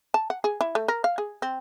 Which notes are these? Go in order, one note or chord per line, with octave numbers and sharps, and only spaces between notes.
A5
F#5
G#4
E4
A3
A#4
F5
G#4
C4